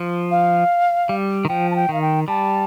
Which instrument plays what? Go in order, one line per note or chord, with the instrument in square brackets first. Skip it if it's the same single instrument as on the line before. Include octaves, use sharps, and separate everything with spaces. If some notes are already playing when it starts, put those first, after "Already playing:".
Already playing: [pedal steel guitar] F3
[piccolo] F5
[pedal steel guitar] G3
D#3
[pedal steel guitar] F3 [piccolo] G5
[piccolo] A5
G5
[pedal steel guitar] D#3 [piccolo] F5
[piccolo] G5
[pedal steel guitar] G3 [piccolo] A5